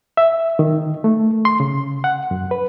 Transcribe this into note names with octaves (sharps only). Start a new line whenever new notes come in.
E5
D#3
A3
C6
C#3
F#5
F#2
B4